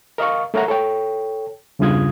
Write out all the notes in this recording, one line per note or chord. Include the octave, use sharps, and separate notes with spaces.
A#4 D#5 F5 C#6
A3 A#4 C#5 F#5 A#5
A4 C#5 G5
E2 G2 C#3 F4 D#6 G#6